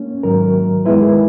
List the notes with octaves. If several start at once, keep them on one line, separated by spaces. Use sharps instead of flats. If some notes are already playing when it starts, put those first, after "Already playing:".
Already playing: A#3 C#4
G#2 D#3 F#3 A#4
D#3 G#3 B3 E4 B4
G#4